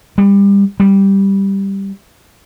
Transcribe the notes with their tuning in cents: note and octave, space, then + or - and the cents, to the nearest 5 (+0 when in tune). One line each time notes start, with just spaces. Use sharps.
G3 +25
G3 +0